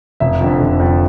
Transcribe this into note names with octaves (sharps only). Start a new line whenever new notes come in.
F1 E5
F2 D3
F1
F2 D3